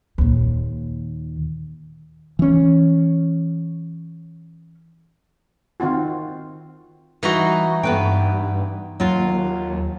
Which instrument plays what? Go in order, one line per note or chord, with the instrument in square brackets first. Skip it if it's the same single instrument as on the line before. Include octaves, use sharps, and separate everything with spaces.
[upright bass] D#2 A#2
[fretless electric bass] E3 C#4
[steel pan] D#3 C4 F4 F#4
[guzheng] E3 D#4 F#4 [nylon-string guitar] G3
[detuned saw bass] G2 [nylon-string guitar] B3 B4 G5
[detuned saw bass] D#2 [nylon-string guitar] F#3 F4